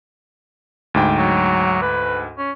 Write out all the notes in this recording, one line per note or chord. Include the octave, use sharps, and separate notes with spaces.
D2 G#2 G5
F#3
B4
C#4